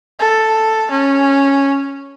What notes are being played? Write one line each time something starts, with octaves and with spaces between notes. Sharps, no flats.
A4
C#4